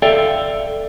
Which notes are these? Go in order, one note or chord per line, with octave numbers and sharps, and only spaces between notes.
A4 D5 E5 F5 G5